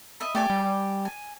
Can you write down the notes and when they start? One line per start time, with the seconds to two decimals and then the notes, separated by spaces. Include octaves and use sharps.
0.20 D#5 E5 B5
0.35 A3 G4 D5 G#5
0.50 G3
1.05 G#5